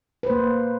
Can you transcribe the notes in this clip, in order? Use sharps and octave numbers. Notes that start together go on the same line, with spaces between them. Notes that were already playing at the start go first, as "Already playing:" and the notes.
A#3 B4 C5